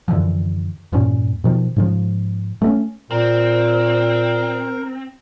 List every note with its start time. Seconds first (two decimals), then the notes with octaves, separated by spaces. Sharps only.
0.08 F#2 D3 E3 F3
0.92 E2 G2 A#2 C#4
1.44 B2 D#3 F3
1.76 G#2 C#3 F3
2.62 A3 B3 C#4
3.11 A#2 C4 A#4